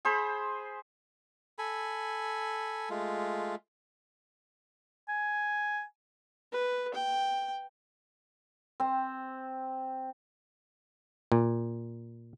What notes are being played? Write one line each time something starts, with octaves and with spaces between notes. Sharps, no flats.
G#4 C5 B5
A4 G#5 B5
G#3 A3 F4
G#5
B4
G5
C4
A#2